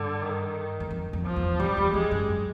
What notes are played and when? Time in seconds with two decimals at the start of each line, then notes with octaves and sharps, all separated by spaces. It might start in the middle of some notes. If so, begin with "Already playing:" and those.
Already playing: G2 D3
0.22 D#3
0.80 E2
0.91 F2
1.13 F2
1.26 F3
1.36 E2
1.60 F2 G3
1.77 E2
1.94 F2 G#3
2.11 F#2